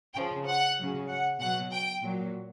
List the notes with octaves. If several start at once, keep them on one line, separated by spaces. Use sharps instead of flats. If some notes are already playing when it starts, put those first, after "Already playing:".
C#3 F3 G5
F#5
C#3 F#3
F#5
B2 F#3 F#5
G5
A#2 F#3